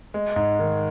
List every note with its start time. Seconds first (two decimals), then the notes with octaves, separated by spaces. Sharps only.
0.14 G#3
0.36 G#2
0.59 D#3